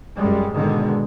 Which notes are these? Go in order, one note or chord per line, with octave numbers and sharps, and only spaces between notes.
F#2 B2 G3 G#3
G#2 B2 D3 D#3 G#3